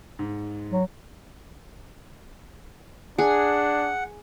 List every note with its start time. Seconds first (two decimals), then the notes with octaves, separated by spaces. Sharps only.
0.19 G#2
0.71 F#3
3.18 D4 G#4 F#5